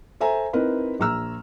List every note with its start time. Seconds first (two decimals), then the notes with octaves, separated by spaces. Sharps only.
0.20 A4 C5 E5 G#5 A#5
0.53 C4 D#4 E4 A#4 B4
1.00 A#1 A#5 E6 F6